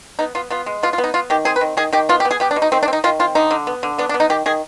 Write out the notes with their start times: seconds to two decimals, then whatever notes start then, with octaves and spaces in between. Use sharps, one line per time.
0.19 B3 D#4
0.35 B3 F4
0.50 B3 F4
0.66 G#3
0.83 B3 F4
0.93 F4
0.98 B3
1.04 D#4
1.14 B3 F4
1.30 D#3 G4
1.45 C4 G#4
1.56 B4
1.61 D#3
1.77 D#3 G#4
1.93 D#3 G4
2.09 B3 F4
2.20 G4
2.25 B3
2.31 G#4
2.40 B3 G4
2.51 D4
2.56 B2
2.62 D#4
2.72 D#3 C4
2.83 D4
2.88 C4
2.93 D#4
3.04 D#3 F4
3.19 C4 F4
3.35 D3 D#4
3.51 D3
3.67 B3
3.83 D3
3.98 B3 D4
4.09 D4
4.14 B3
4.20 D#4
4.30 D#3 G4
4.46 D#3 G#4